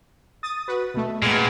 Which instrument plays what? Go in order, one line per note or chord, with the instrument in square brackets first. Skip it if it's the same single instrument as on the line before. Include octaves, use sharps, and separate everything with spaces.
[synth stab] D#6 A6
F#4 B4
B2 A3
[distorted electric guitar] A#2 [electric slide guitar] G#3 B3 [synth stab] F6 G#6